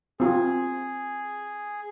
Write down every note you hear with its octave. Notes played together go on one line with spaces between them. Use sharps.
C4 F4 G#4